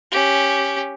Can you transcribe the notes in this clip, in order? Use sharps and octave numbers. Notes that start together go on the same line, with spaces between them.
C#4 G4